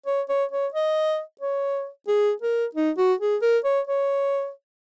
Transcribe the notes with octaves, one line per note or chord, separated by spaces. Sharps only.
C#5
C#5
C#5
D#5
C#5
G#4
A#4
D#4
F#4
G#4
A#4
C#5
C#5